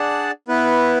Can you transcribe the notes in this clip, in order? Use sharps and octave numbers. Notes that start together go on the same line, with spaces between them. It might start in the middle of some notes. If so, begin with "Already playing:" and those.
Already playing: D4 G#4 D5 F#5 A5
B3 E4 B4